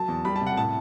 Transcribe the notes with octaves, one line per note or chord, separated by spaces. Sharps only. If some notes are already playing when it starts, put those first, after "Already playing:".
Already playing: F#3 A5
E2
G3 B5
A5
C3
F#5
A2 A5